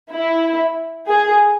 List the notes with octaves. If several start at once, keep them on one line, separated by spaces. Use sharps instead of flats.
E4
G#4